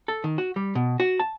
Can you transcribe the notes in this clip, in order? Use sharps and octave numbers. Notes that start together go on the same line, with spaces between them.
A4
D#3
F#4
G3
B2
F#4
A5